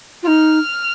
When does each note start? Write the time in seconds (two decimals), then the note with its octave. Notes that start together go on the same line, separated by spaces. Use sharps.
0.22 F4
0.27 D#4 F6